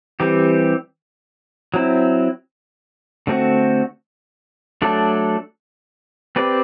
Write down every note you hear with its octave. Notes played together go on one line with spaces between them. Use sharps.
E3 G3 C4 G4
F#3 C4 E4
D3 A3 C4 F#4
F#3 A3 D4 A4 D5
C4 G4 B4 D5